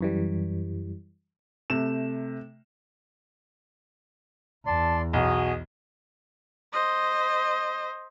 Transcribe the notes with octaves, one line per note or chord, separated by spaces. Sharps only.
F#2 E3 G3
C3 A3 E7
E2 D5 A5 C6
B1 F#4 G#4 D#5
C5 D#5